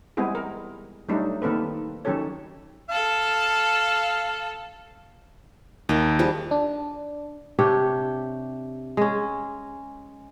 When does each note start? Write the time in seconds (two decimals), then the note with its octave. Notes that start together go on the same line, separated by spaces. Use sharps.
0.17 G3 G#3 B3 C4 E4 G#4
0.35 A#4
1.09 F#3 G3 A3 D4 D#4
1.42 D#3 A#3 C4 A4 B4
2.05 D#3 F#3 C#4 G4 A4 C#5
2.89 A4 F5 A5
5.89 D#2 D#4 A#4 E5
6.19 F3 G3 G#4
6.51 D4
7.59 C3 D4 G4 C#5
8.97 G#3 C#4